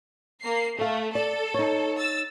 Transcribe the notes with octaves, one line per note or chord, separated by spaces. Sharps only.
A#3 C7
A3 A4 F5
A4 D5
D#4 C#5
E6 A6